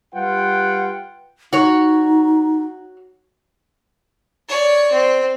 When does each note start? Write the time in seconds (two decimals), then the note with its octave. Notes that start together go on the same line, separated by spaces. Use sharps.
0.14 G3 F4 B4 F#5 G5
1.53 D#4 F#4 C#5
4.48 C#5 D5
4.92 C4